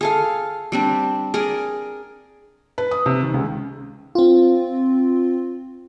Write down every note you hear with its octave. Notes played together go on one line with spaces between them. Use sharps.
G#4 A4 F5
G3 C4 D4
G#4 A#4 D5
B4
D#6
C3
D#3
C#2
C4 F4